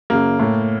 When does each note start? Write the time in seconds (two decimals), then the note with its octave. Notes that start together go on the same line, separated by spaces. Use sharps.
0.10 F#2 C#3 A#3
0.40 A2